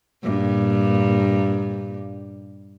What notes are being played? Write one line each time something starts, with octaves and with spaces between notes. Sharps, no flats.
G2 A#2